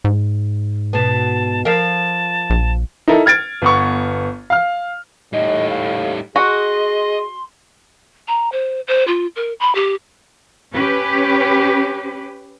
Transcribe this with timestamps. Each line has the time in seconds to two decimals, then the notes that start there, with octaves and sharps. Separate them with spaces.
0.04 G#2
0.93 B2 B3 A5
1.65 F3 A#4 F5 A5
2.50 A#1
3.08 D#4 E4 A4 A#4
3.26 F6 G#6 A6 D7
3.62 G1 B3 C#6
4.50 F5 F6
5.33 A2 G3 D#4 D#5
5.69 F5
6.36 F#4 G#4 D#5 C6
8.28 A#5
8.52 C5
8.88 C5
9.07 F4
9.36 A#4
9.60 B5
9.75 G4
10.74 C#4 G4 B4